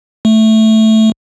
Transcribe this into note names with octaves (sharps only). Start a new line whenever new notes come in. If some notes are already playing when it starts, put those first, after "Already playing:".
A3